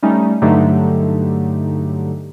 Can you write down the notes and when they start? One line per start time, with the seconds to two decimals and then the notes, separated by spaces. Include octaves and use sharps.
0.02 G3 A3 C#4 D#4
0.42 G2 D3 F#3 A3 D#4 G4